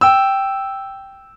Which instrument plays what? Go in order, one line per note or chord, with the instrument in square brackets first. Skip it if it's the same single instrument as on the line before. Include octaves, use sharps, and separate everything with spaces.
[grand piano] G5 E6